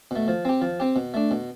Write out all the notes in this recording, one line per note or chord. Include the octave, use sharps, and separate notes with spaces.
B2 A3
F3
C4 G4
F3
C4 G4
B2
A3 D4
B2